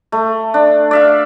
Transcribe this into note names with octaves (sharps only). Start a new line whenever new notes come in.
A3
D4
D5 E5 F5